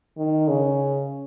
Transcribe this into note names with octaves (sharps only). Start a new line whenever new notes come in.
D#3
C#3